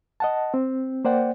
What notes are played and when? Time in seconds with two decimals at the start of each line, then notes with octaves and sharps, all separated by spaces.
0.20 D#5 F#5 A5
0.54 C4
1.05 A#3 C5 D5 F#5 G5